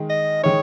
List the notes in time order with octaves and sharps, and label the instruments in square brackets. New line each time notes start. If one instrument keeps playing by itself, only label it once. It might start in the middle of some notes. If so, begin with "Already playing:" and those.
Already playing: [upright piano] D#3 G#3 D#4
[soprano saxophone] D#5
[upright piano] D#3 G#3 D#4 [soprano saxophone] C#5